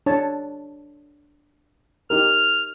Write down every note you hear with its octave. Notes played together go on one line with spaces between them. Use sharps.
D4 C#5 A5
D#4 G4 A#4 F6